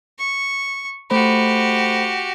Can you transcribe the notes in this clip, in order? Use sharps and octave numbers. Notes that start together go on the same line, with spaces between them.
C#6
A3 F#4 G4 C5 B5